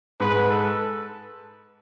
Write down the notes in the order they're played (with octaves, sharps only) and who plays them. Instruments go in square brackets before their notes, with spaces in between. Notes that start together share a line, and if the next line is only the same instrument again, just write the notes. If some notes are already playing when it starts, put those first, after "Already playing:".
[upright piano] G#2 G#3 [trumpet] B4
[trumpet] A4